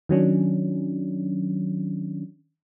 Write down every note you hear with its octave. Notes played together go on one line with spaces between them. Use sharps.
D#3 F#3 C#4 D4